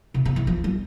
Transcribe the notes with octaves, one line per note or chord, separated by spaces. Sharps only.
C3
C#3
E3
F3
G3